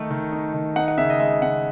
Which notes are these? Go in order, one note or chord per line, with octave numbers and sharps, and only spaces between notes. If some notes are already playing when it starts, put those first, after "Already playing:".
Already playing: D#3 A3 D#4
D#3
D#4
D#3
D#4 F#5
F#5
C#3 E5
D#5
G#3 E5
C#3 F#5